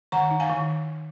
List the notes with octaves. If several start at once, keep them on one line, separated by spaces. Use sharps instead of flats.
D#3 F#5 A#5
D#4
F5 G#5
D#3